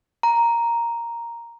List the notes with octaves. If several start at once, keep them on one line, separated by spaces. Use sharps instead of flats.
A#5